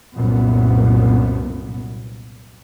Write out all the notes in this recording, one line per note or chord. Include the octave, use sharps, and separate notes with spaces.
C2 F#2 A#2 B3